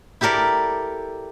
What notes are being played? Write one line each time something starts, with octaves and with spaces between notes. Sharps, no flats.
E4 G4 A4 A#4 D5